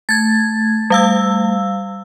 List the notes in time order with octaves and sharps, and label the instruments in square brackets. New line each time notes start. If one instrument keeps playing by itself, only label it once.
[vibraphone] A3 [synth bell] G#6 A6
[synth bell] G3 F5 E6